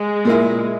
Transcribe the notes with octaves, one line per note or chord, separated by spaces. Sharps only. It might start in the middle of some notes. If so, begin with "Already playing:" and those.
Already playing: G#3
A#2 A#3 E4